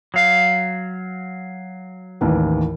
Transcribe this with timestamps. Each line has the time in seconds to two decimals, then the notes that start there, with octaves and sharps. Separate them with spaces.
0.14 F#3 F5
2.21 A1 D#2 E3